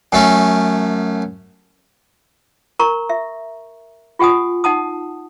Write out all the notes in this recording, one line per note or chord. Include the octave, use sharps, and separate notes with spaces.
F#2 A3 C#4
A#4 A#5 C#6
E5
F4 G4 F#5 G#5 D#6
D#4 F#5 A5 D#6